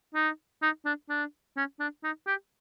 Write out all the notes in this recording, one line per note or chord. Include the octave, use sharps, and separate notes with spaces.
D#4
D#4
D4
D4
C#4
D4
D#4
G4